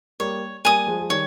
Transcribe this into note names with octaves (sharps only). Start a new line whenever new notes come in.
G3 A#3 C#5
G3 A#3 G#5 D#6
F3 G#3
G#3
D#3 G3 C#5